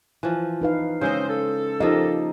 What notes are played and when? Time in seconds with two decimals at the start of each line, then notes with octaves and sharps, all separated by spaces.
0.23 E3 F3
0.62 D#4 B4 F5
1.01 C#3 G#3 C4 C5 D#5
1.29 A4
1.80 F3 A#3 D#4 G4 D#5